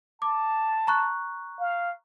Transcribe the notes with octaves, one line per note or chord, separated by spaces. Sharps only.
A5 D6
A#5 C#6 F#6
F5